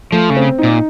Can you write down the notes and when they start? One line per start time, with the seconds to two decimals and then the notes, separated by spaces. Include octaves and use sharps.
0.12 F3 A3
0.30 C#3
0.36 C4
0.58 A#2 D#4